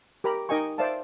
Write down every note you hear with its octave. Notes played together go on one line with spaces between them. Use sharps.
G4 A#4 A#5 B5
D#4 A#4 D#5 G5 G#5 C#6
C5 D5 E5 F5 A5